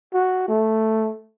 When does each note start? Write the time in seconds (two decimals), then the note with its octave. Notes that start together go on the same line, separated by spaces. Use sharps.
0.14 F#4
0.49 A3